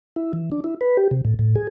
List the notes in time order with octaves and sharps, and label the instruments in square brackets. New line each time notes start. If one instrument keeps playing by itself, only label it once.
[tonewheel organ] E4
E3
D4
E4
B4
G4
C3
A2
A2
G#4